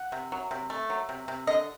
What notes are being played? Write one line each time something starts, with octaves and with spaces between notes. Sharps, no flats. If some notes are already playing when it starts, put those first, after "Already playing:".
Already playing: F#5
C3
F#3
C3
A3
F#3
C3
C3
D3 D#5